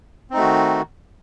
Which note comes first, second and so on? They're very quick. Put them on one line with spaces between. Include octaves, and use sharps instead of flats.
C4 D#4 A3 F#4 D#3